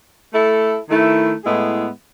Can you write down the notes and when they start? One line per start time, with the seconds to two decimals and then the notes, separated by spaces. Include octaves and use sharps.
0.33 A3 E4 A4
0.89 D#3 A3 E4
1.44 A2 G#3 B3 E4 G#4